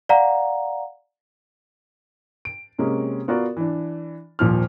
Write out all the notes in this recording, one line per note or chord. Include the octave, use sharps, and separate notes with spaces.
D5 F5 F#5 A#5
D7
C3 G#3 A#3 C#4
B3 F4 F#4 A#4 D5
E3 D4
D#1 A#2 F3 F6